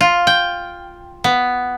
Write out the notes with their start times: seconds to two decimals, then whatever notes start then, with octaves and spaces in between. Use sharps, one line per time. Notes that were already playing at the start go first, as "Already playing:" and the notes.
0.01 F4
0.27 G5
1.24 B3